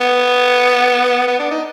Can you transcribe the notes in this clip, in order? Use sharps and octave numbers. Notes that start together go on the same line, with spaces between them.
B3
B3
D4
D#4